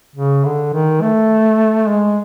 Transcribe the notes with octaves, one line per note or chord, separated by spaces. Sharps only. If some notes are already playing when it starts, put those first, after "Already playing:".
C#3
D3
D#3
A3
G#3